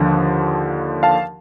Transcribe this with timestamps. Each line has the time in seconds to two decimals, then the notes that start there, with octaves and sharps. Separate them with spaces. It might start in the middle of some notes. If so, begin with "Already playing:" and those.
Already playing: D#2 D3 F3
1.03 F5 A5